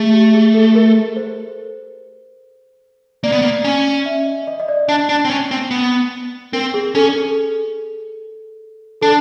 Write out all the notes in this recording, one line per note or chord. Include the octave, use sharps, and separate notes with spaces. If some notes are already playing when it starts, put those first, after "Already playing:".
Already playing: A3 G#4
G4
G#4
A4
A#4
C5
A#3 D5
B3
A#3
C#4
E5
D#5
D#5
D#5
D5
D4
D4
C4
C#4
C4
B3
C4 A#4
G#4
C#4 A4
A4
D4 A4